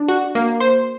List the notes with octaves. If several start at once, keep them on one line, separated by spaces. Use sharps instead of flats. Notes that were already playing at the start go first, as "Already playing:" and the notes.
Already playing: D4
F#4
A#3
C5